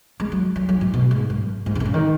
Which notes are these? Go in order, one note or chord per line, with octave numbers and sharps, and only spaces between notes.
G#3
F#3
F#3
F#3
G#2
B2
G#2
F#2
G#2
C#3
B2
C#3
D#3